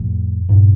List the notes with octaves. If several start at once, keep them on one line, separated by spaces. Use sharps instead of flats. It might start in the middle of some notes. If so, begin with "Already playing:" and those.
Already playing: F2 A2
G2 A#2